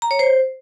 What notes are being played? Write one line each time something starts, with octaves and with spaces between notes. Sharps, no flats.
A#5
C#5
C5